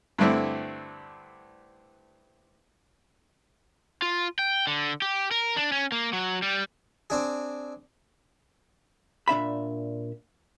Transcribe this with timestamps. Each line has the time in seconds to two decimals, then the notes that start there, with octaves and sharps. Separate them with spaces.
0.18 G2 D3 A3 C4 E4
4.02 F4
4.39 G5
4.67 D3
5.02 G4
5.31 A#4
5.57 D4
5.72 C#4
5.92 A#3
6.13 F#3
6.42 G3
7.10 C4 D4 G#4
9.28 A#2 D4 E5 B5